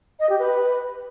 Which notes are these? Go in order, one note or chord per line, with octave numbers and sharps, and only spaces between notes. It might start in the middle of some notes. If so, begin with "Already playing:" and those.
D#5
G4
B4